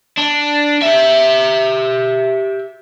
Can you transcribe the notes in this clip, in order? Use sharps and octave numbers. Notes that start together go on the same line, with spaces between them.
D4
G4 E5